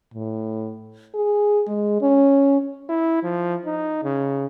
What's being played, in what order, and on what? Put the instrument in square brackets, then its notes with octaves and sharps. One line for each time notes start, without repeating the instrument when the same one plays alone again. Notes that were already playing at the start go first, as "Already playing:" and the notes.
[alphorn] A2
G#4
G#3
C#4
[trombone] E4
F3
D#4
C#3